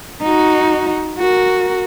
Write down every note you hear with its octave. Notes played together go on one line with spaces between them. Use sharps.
D#4 F#4
F#4 A#4